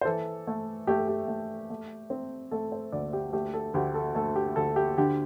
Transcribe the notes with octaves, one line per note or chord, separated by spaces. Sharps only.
C5
E3 A4
A3
A3 G4
A4
G4
A3
A3
C4
A3 A4
C5
D2 D5
G4
A3 G4
A4
D2 G4
A4
A3 A4
G4
D2 A4
G4
D3 G4